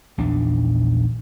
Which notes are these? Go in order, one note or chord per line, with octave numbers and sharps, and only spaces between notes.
A#1 E2 D#3 D4